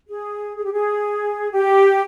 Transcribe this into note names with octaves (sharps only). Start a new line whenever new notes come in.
G#4
G#4
G4
G#4
G4